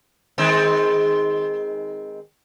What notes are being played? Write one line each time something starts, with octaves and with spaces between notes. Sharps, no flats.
D#3 G#3 C4